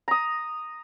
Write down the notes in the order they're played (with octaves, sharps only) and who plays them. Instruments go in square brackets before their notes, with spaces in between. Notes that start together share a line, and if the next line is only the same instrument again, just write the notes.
[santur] A#5 D#6